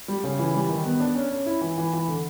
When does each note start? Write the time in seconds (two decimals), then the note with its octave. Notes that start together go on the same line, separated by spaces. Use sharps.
0.08 G3
0.24 C#3
0.39 E3
0.54 G3
0.69 D#3
0.85 B3
1.00 D4
1.15 C#4
1.32 C#4
1.46 E4
1.61 E3
1.78 E3
1.93 E3
2.08 D3